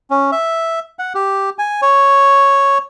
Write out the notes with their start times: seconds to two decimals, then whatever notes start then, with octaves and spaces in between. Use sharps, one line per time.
0.11 C#4
0.32 E5
0.99 F#5
1.15 G4
1.59 G#5
1.82 C#5